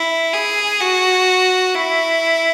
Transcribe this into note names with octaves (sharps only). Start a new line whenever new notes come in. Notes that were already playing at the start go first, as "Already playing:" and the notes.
Already playing: E4
G#4
F#4
E4